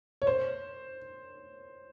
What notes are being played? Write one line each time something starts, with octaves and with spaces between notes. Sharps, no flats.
C#5
C5